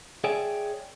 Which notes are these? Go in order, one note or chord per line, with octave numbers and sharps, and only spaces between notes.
G#4 C#5 D5 E5 G5 G#5